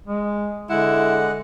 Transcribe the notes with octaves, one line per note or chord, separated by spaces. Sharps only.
G#3
D3 G#3 E4 F#5